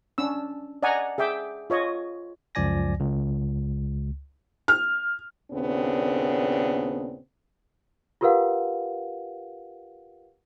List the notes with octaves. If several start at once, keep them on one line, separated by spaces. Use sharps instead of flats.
C#4 D4 E6
D5 D#5 F#5 G#5 A#5
G#4 E5 G5 D6
F4 C#5 D#5
C#2 F#2 F3 D5 G#5 A#6
C#2
F6
D#2 A#2 C#3 B3 C4 D4
F4 G4 A#4 B4 F5 F#5